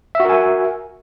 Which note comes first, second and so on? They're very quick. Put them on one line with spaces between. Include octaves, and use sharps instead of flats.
E5 F#4 A#4 G#5